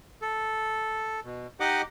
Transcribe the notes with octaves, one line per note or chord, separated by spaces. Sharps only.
A4
B2
D#4 G4 D#5 F#5 D6